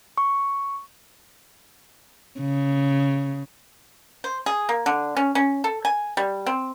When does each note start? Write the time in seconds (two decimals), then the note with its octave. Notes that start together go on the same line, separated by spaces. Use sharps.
0.18 C#6
2.40 C#3
4.24 C5
4.46 G#4
4.69 A#3
4.86 D3
5.17 C#4
5.35 C#4
5.64 A4
5.85 G#5
6.17 G3
6.46 C4